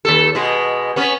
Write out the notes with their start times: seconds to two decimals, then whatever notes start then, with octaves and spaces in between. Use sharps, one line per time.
0.05 D#2 A4
0.35 B2 G#3
0.96 B3 C#4